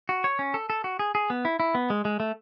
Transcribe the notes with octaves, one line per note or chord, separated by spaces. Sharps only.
F#4
C#5
C#4
A4
A4
F#4
G#4
G#4
B3
E4
E4
B3
G#3
G#3
A3